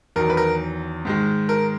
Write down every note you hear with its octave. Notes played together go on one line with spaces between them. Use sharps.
E2 D#3 F#3 A#4
B4
A#4
G#2 D#3 G#3
A#4